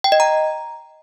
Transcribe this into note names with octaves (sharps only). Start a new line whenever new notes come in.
G5
D#5
A#5